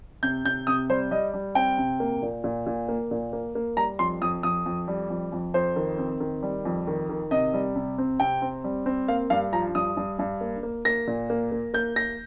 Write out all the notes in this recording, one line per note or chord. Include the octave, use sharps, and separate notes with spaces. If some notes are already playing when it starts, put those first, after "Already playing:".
C3 G6
C3 G6
C3 D#6
G3 C5
G3 D#5
G3
C4 G5
C3
A#3
A#2
A#2
A#2
A#3
A#2
A#3
A#3
G3 A#5
F2 C6
F2 D#6
F2 D#6
F2
G3
F2
F2
F2 C5
D#3
C4
D#3
G3
F2
D#3
D#3
C3 D#5
G3
C3
C4
C3 G5
C4
G3
C4
A#3 F5
G2 F5
F3 A#5
G2 D#6
G2
G2
A#3
A#3
A#3 A#6
A#2
A#3
A#3
A#3 G6
A#3 A#6